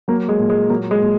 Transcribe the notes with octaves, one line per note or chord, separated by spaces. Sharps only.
F#3 A#3
G#3
A#2
G#3
F#3 A#3
G#3
A#2